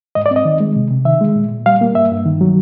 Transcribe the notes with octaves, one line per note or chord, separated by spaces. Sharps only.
G#2 D#5
D5
C4
D#5
D#3
G#3
C3
C3
D#3 E5
G#3
A#2
A#2
G3 F5
A#3
G2 E5
G2
D#3
F#3